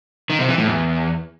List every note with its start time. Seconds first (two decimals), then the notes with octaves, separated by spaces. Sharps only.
0.30 D#3
0.39 C3
0.49 E3
0.58 A2
0.68 E2